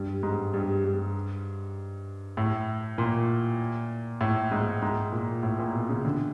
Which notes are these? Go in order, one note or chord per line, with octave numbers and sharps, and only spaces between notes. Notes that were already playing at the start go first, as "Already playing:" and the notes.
Already playing: G2
G#2
G2
G2
A2
A#2
A2
G#2
G#2
A#2
A2
A#2
B2
C#3
D3